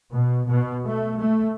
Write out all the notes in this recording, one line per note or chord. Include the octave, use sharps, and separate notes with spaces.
B2
B2
A3
A3